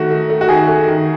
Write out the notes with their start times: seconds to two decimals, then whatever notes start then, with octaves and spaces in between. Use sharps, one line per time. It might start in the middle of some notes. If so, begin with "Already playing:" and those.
Already playing: D#3 A3 F#4
0.10 A3
0.30 A3
0.41 F#4
0.48 D#3 G#4
0.67 A3
0.88 D#3